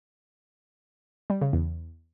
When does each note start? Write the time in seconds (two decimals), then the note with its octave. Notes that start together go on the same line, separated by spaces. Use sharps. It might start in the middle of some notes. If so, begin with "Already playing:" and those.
1.30 G3
1.41 C#3
1.53 E2